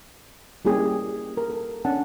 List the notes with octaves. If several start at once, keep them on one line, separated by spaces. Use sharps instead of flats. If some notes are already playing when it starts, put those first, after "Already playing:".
G3 A#3 C#4 E4 G4 G#4
A#4
A4
C#4 D4 F#5 A5